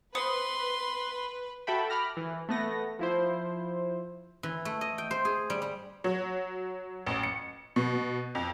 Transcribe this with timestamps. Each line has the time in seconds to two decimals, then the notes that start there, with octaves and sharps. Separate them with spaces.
0.15 B4 C5 C6 D#6 C#7
1.67 F#4 A4 E5 G5 B5
1.90 B5 D6 F6 A#6
2.17 E3
2.49 A3 B3 A#6
2.99 F3 E4 C5
4.43 E3
4.65 A3
4.81 D#5
4.98 G5
5.11 C5
5.25 G#4
5.50 G3
5.62 G3
6.04 F#3
7.06 A1
7.23 C#7
7.76 B2
8.35 F2